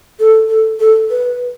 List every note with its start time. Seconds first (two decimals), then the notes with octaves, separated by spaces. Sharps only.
0.20 A4
0.49 A4
0.80 A4
1.10 B4